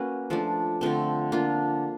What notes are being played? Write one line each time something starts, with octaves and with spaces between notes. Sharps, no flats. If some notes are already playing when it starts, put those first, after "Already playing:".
Already playing: A#3 C#4 F#4 B4
F3 A3 D4
D3 F3 A3 C4
A#3 D4 F4